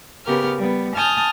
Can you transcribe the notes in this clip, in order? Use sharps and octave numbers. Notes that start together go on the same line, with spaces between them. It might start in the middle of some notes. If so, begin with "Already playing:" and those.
C#3 B3 G4 A#4 F6
G3 B3
G#5 A5 D#6 F6 G6